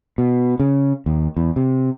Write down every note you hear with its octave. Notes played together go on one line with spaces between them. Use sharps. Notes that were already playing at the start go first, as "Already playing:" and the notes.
B2
C#3
D#2
E2
C3